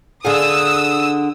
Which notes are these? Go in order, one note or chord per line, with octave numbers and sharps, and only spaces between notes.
D3 G#4 F5 D#6 E6